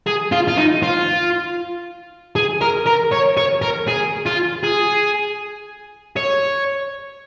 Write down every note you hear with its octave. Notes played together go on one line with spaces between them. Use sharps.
G#4
F4
F4
D#4
F4
G#4
A#4
A#4
C#5
C#5
A#4
G#4
F4
G#4
C#5